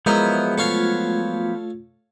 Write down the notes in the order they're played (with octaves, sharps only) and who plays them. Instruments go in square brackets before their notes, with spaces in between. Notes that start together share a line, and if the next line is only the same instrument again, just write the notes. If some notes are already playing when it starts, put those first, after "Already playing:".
[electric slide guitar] F3 F#3 B3 [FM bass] G#3 [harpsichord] E4 A#4 D#5 [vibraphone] G#4
[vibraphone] A3 F4 [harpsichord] A4 C#5 F5